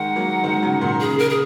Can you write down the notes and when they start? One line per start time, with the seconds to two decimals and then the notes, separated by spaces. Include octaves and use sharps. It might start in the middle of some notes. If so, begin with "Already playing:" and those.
Already playing: D#3 G#3 F#5
0.16 F#3 A#3
0.43 D#3 G#3
0.63 C#3 F#3
0.81 A#2 D#3
1.00 C#3 G#4
1.19 A#4
1.29 G#4